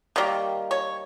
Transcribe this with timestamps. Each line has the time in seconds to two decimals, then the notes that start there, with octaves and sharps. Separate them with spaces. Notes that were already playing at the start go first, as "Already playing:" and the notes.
0.16 D#3 G3 A#3
0.71 C#5